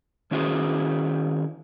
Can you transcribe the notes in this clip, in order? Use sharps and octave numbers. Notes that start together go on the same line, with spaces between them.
D#3 C#4 E4 F#4 G#4 C5